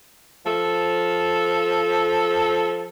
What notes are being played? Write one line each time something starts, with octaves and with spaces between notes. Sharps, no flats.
F3 A4